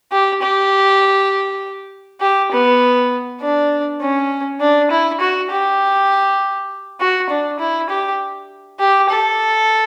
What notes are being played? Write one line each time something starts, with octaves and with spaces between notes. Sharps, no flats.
G4
G4
G4
B3
D4
C#4
D4
E4
F#4
G4
F#4
D4
E4
G4
G4
A4